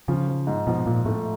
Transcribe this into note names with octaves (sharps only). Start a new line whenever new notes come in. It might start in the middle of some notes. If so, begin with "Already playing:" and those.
C#3 F3
F3
G#2
B2 F3
A#2 F3
A2 A3